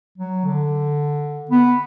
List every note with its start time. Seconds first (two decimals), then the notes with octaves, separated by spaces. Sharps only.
0.18 F#3
0.45 D3
1.51 B3